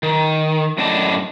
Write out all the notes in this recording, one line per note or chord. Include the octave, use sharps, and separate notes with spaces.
D#3
F#2 A2 D4 D#5 A5